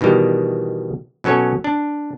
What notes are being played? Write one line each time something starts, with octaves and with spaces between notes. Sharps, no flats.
B2 D#3 E3 G3
B2 F#3 C#4 A4 C#5
D4